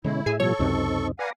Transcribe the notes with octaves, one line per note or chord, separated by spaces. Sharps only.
B2 D3 G#3 C#4 E4
A2 G#4 E5 G#5
B2 F3 G3 A4 C#5 C#6
C#2 F#2 C3 C4 D#4
B4 D5 F5 F#5 G#5 A#5